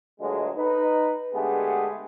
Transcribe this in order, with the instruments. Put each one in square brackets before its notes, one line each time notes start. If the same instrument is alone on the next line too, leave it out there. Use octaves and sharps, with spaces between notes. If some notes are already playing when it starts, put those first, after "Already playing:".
[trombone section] D2 A#2 F#3 G#3
D#4 B4
D3 G#3 A3 B3 G4 G#4